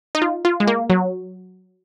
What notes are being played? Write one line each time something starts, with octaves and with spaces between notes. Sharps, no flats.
D#4
F4
F4
G#3
A#3
F#3